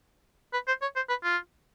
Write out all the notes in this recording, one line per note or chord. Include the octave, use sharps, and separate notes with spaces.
B4
C5
C#5
C5
B4
F4